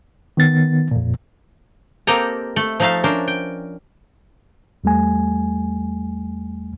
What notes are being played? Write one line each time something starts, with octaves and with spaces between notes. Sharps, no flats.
D#3 B3 A6
F2 A#2
A#3 C4 G4 A4 D#5 A#5
A3 A4
F3 A3 D#4 E5 F5 A5
C#4 D4 A#4 C5
G5
E2 G3 A3 G#5